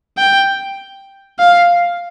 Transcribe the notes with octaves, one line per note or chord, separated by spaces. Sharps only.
G5
F5